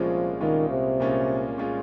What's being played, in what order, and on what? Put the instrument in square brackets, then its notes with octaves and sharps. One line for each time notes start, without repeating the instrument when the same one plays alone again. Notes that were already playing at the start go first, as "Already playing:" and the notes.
Already playing: [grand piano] C2 A#2 G#3 C#4 F4 [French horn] F3
[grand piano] C2 A#2 G#3 C#4 F4 [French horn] D#3
[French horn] C3
[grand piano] C2 A#2 G#3 C#4 F4
A#2 G#3 C#4 F4